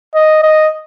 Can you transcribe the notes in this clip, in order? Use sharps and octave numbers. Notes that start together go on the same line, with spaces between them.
D#5
D#5